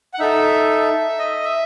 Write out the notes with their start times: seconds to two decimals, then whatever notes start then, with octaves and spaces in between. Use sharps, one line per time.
0.14 F#5
0.20 D#4 A4 E5
1.19 D#5
1.44 E5